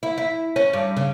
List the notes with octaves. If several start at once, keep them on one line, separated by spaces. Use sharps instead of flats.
E4
E4
C#4
G2
C#3